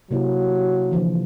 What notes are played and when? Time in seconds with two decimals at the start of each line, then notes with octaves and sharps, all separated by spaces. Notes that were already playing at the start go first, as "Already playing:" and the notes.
0.11 C3 F#3 A#3 E4
0.91 D3 E3 F3